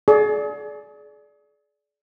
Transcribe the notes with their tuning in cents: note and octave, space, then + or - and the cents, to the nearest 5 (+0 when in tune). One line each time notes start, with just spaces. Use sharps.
G#4 +35 D5 -10